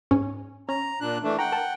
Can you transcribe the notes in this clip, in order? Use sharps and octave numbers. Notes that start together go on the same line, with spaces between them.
G#2 C#4
C#4 A#5
A#2 D4 F#6
E3 A3 D4
F#5 G5 A#5
A#4 A5